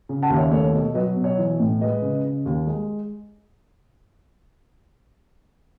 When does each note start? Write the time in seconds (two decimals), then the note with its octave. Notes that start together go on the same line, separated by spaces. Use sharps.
0.09 C#3
0.22 F#5 A5
0.30 D#2
0.37 C#5 E5
0.51 A3 C#5
0.73 B2
0.94 F#3 B4 D#5
1.16 B2
1.24 C#5
1.38 E3
1.59 A2
1.81 G#3 B4 D#5
2.02 C#3
2.25 C#3
2.46 D#2
2.67 G#3